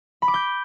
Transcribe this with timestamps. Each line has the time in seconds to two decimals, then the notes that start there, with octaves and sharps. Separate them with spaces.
0.22 B5
0.28 D6
0.34 G6